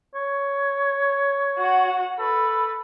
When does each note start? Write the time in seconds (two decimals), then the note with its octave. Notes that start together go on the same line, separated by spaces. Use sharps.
0.15 C#5
1.59 F#4 F#5
2.19 A4 B4